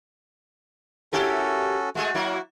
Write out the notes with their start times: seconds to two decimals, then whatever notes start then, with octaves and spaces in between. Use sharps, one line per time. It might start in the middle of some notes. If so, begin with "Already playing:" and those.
1.13 C#4 E4 F#4 G4 A4 A#4
1.95 G#3 A3 F#4 G#4
2.15 F#3 A#3 E4